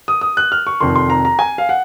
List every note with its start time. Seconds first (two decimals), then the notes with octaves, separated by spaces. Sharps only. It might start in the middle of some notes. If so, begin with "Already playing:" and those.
0.08 D#6
0.21 D#6
0.37 F#6
0.52 F6
0.67 C#6
0.81 F1 F2 D#3 C6
0.95 C6
1.10 A#5
1.25 A#5
1.39 G#5
1.58 F5
1.69 F#5